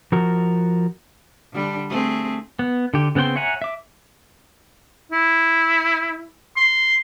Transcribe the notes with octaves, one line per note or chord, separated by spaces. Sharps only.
F3 F#4 A#4
D3 G3 D4
A3 C4 G#4
B3
D3 G4
C#3 B3 C4 G5 C6
C#5 E5 F#5 G#5 A#5
E5 D6
E4
C6